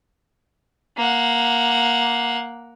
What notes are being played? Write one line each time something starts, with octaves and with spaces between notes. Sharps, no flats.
A#3 F#5